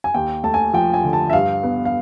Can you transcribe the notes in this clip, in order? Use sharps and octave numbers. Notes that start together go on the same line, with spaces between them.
G#5
D#2 G5
A3 A5
G#5
F3 G5
G#5
D3
A5
E5
G2 F5
B3
F5